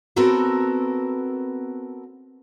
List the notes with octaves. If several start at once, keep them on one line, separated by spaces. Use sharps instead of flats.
B3 C4 F#4 A4 A#4 C#5